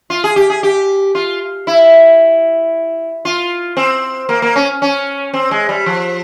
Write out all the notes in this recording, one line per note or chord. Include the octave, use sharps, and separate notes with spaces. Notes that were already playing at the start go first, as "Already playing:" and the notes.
F4
G#4
G4
G#4
G4
F4
E4
F4
C4
A#3
A#3
C#4
C#4
C4
G#3
G3
F3